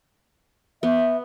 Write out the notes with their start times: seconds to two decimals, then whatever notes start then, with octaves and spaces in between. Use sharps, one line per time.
0.83 B3 E5